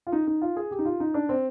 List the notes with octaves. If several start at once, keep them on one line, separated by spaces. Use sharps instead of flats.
F4
D#4
D#4
F4
G#4
G4
D#4
F4
D#4
D4
C4